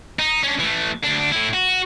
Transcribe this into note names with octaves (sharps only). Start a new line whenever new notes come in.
D#4
C#4 D4
E3 A3
D2 D4
A2 E4
F#4